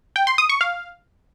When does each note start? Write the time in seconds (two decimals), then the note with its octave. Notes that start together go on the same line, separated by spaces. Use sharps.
0.16 G5
0.27 C6
0.38 D#6
0.49 C#6
0.61 F5